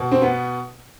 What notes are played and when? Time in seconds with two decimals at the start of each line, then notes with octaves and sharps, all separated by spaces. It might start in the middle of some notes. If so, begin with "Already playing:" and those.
Already playing: B2
0.12 C4
0.22 B3